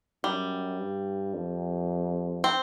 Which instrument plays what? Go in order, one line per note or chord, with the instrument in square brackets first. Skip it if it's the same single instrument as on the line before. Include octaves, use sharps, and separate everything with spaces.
[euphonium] F#2 [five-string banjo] G3
[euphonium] G2
F2
[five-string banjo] C4